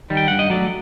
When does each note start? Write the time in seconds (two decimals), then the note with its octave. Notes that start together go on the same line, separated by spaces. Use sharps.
0.10 D#3 G3
0.17 G5
0.28 G2 F#5
0.39 D#5
0.50 F#3 A3 D5